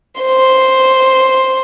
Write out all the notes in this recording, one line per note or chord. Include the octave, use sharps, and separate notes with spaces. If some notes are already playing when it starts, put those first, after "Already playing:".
C5